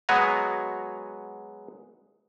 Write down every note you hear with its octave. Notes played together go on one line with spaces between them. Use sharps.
F#3 G#3 B3 F#4 G#5 A#5